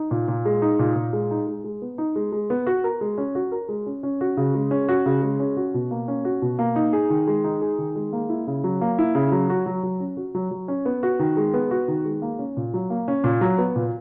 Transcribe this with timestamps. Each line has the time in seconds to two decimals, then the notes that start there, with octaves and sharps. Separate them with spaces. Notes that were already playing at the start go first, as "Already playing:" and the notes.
Already playing: D#4
0.11 A#2
0.28 A#2
0.45 G#3
0.62 D#4
0.79 A#2
0.96 A#2
1.13 G#3
1.31 D#4
1.47 G#3
1.64 G#3
1.82 B3
1.98 D#4
2.16 G#3
2.32 G#3
2.50 B3
2.67 F#4
2.84 A#4
3.01 G#3
3.18 C#4
3.35 F#4
3.52 A#4
3.69 G#3
3.86 C#4
4.03 C#4
4.21 F#4
4.37 C#3
4.55 G#3
4.71 C#4
4.89 F#4
5.06 C#3
5.22 G#3
5.40 C#4
5.57 F#4
5.74 B2
5.91 A#3
6.08 C#4
6.25 F#4
6.42 B2
6.59 A#3
6.76 D#4
6.93 G#4
7.10 D#3
7.27 G#3
7.44 D#4
7.61 G#4
7.78 D#3
7.96 G#3
8.13 A#3
8.29 E4
8.47 C#3
8.64 F#3
8.81 A#3
8.99 E4
9.15 C#3
9.32 F#3
9.50 F#4
9.66 F#3
9.83 F#3
10.00 C#4
10.17 F#4
10.35 F#3
10.51 F#3
10.68 C#4
10.85 B3
11.03 F#4
11.19 D#3
11.37 G#3
11.54 B3
11.71 F#4
11.88 D#3
12.05 G#3
12.22 A#3
12.39 C#4
12.57 A#2
12.74 F#3
12.90 A#3
13.08 C#4
13.24 A#2
13.41 F#3
13.58 B3
13.76 A#2